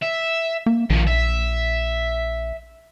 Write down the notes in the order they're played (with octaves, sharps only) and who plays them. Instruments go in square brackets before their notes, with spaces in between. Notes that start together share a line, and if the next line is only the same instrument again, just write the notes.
[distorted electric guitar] E5
[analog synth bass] A#3
[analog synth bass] A#1 [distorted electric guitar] D#3 F3
[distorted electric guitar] E5